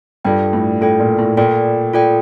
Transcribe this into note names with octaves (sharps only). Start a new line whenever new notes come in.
G2 F4 A4 D5 G5
A2
A2 F4 A4 D5 G5
A#2
A2
A#2 F4 A4 D5 G5
F4 A4 D5 G5